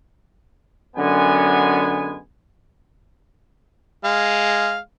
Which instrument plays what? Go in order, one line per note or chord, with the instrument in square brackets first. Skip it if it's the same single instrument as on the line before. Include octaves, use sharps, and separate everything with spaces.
[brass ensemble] F#2 D3 G#3 B3 G#5
[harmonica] G#3 F5